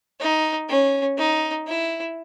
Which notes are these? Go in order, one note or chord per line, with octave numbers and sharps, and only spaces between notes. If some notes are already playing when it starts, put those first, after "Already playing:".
D#4
C#4
D#4
E4